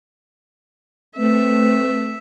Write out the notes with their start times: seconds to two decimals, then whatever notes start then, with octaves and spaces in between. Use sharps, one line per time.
1.17 A3 C4 B4 E5